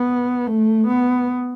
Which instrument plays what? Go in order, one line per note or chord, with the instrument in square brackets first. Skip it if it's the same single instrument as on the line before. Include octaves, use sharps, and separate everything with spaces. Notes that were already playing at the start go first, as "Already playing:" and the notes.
Already playing: [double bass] B3
A3
B3